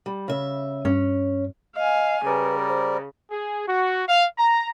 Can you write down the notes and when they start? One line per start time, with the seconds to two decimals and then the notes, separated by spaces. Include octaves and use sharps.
0.06 G3
0.28 C#3 E5
0.85 G2 C#4
1.76 D#5 F5 G#5
2.26 C#3 G3 A#4 B4 D5
2.69 C5
3.31 G#4
3.68 F#4
4.08 F5
4.39 A#5